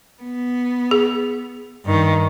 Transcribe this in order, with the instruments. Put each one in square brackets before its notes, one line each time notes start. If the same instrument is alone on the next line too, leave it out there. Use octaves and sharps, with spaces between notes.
[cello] B3
[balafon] G#4
[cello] G2 D#3